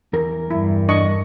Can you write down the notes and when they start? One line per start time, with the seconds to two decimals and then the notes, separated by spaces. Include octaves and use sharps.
0.13 E2 A#4
0.51 G2 E4
0.89 D4 D#5 C#6